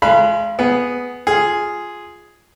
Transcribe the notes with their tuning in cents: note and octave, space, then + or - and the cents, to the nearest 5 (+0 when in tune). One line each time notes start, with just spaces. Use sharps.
G#3 +30 F5 -35 B5 -10
B3 +0 G#4 +0
F4 +0 G#4 +0